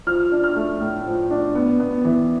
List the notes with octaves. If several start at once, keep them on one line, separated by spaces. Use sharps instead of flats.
F3 F6
D4
F6
A3
A2
F3
D4
B3
B3
E3